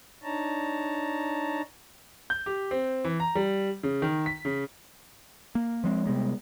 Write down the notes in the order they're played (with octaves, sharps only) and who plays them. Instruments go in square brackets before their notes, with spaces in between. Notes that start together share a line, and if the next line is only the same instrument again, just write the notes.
[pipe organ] D4 D#4 C#5 A5 A#5
[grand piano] G6
G4
C4
E3
A#5
G3
C#3
D#3
B6
C#3
[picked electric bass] A#3
F3 G#3 C4
C3 G3 G#3 B3